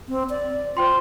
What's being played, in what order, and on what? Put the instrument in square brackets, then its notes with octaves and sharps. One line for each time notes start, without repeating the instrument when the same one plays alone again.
[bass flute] C4
D5
[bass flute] F4 [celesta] C5 G5 C6